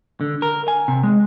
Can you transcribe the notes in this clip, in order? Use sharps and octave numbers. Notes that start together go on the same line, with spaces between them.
D3
A#4
G#5
C3
G#3